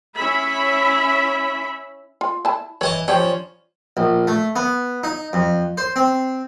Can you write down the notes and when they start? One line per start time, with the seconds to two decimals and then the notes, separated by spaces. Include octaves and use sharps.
0.17 C#4 E4 E5 B5
2.21 F4
2.45 E4 A5
2.81 E3 C#5 D#5 A5
3.08 F3 G3 C#4 D4 G4
3.97 A#1
4.27 A3
4.56 B3
5.04 D#4
5.33 F2
5.78 C5
5.96 C4